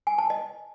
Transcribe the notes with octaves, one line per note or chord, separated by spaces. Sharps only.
G#5
A5
D#5